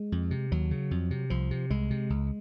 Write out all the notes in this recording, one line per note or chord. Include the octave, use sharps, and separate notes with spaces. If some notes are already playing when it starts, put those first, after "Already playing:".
Already playing: G#3
F2
C3
D#2 F#3
C#3
F2
C3
C2 F3
C3
C2 G#3
C3
C#2